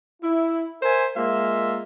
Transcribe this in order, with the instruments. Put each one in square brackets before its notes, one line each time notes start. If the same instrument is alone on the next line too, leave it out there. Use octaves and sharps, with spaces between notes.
[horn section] E4
A#4 C5 E5 G#5
G#3 A#3 F4 E5